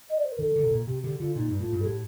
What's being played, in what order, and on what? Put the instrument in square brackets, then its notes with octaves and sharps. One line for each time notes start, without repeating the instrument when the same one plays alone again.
[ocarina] D#5
D5
C5
A#4
[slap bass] D#3 [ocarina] A4
[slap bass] D3
C3
A#2
[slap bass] C3 [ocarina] G4
[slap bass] D3 [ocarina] G4
[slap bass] D3 [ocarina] F4
[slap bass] A#2 [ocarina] D#4
[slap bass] G2
[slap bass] A2 [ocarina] F4
[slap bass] G2
[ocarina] A4
[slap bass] A2 [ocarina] G4